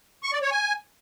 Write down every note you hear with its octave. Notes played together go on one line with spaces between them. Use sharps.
C#6
D5
C#5
G#5